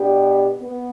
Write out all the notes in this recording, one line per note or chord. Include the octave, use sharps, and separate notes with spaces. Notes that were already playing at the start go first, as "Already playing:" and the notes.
Already playing: B2 B3 D4 G4
B3